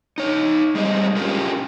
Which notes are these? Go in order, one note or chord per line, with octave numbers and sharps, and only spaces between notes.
D#4 C#5
G3 G#3 C4 D#5
C#4 F4 G4 G#4 A#4